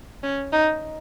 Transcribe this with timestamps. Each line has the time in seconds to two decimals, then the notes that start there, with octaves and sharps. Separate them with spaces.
0.23 C#4
0.53 D#4